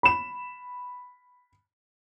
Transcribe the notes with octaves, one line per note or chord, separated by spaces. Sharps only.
B5 E7